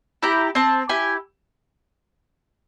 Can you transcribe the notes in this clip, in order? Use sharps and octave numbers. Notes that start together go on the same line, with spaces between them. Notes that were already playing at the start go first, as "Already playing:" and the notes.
E4 G4 A#5
C4 A5
E4 G4 G#5